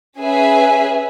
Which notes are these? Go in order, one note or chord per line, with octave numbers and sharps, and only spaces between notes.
C#4 G#4 B4 E5 G#5